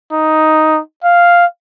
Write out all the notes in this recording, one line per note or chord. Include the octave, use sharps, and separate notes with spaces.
D#4
F5